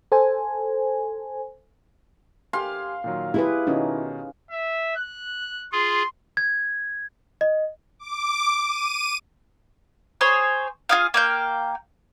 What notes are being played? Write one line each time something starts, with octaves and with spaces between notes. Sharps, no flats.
A4 C5 G#5
G4 F5 G#5 C6
A#2 D#3 F#3
E4 G4 G#4 B4
B2 D#3 C#4 D#4
E5
F#6
F4 G#4 C6
G#6
D#5
D6
D#7
G#4 C5 C#5
F4 G#4 F5
A#3 F5 G5